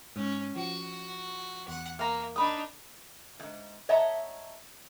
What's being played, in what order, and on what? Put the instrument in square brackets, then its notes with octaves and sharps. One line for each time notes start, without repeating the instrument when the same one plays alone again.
[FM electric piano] G#2 [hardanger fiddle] C#4
[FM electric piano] F3 [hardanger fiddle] F#4
[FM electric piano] E2 [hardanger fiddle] F#5
[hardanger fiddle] A#3 [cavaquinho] F5 A#5
[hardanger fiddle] D4 D#4 [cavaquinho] B5 D#6
[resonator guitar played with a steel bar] F2 G#2
C#5 D#5 E5 F#5 A5 A#5